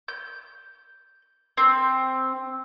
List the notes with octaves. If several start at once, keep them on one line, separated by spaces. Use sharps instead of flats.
G6
C4